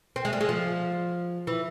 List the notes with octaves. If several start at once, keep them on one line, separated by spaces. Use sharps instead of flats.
C4
G#3
G3
G#3
F3
E3